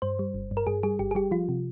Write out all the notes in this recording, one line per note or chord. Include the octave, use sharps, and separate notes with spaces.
G2 C5
G3
G1
G2
A#4
G2 G#4
G3 G#4
G1 G4
G#4
G3 G4
F3 F4
C3